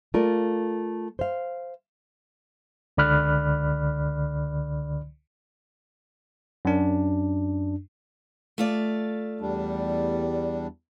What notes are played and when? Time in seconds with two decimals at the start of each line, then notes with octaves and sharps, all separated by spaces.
0.14 A3 F4 A#4 D5
1.19 C5 F5
2.97 C#2 D3 D5 B5 F6 F#6
6.65 F#2 D4
8.58 A3 F4 D5
9.41 E2 G3 D4